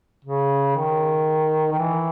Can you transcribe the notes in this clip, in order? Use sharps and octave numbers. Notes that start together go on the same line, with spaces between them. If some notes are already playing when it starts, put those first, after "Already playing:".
C#3
D#3
D#3
E3